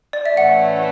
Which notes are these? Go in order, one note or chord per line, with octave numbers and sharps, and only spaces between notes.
D5
E5
A2 E3 A3 C#4 F#5